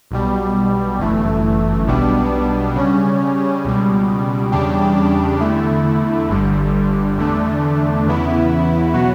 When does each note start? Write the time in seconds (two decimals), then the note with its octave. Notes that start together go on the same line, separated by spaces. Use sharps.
0.11 B1 B2 G3
0.99 G1 F#2 E3 A3
1.87 B1 B2 G3 B3 D4
2.76 C#3 G3 C#4
3.65 C#2 B2 G3
4.52 E2 C#3 G3 D4 G4
5.41 E2 D3 A3 E4
6.30 G1 G2 D3 G3
7.17 E2 D3 A3 D4
8.06 E2 C#3 E3 B3 E4
8.94 B2 F#3 B3 F#4